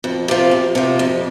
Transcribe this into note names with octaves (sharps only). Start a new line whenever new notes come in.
F2
C3 F3
F2
C3 F3
F2